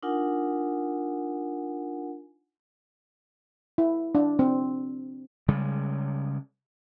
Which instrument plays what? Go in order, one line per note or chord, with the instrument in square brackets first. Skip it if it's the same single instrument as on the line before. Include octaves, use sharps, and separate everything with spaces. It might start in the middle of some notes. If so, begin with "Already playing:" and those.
[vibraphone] D4 D#4 F4 A#4 F#5 G#5
[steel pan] E4
D4
C4
[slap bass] C#3 G3 G#3